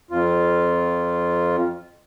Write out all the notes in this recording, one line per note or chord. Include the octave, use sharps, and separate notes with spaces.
F2 F4